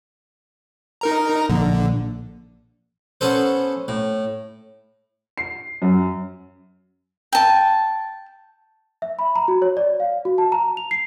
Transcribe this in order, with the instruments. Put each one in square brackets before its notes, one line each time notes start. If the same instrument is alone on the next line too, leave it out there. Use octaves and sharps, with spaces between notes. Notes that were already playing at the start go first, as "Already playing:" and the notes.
[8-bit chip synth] D#4 A#4 A#5
[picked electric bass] A#1 [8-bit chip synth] D3
[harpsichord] B3 C#4 A4 C5
A2
[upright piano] C7
F#2
[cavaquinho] G5 A5
[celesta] E5
B5
A#5
F#4
C#5
D5
F5
F#4
A5
A#5
F7
C7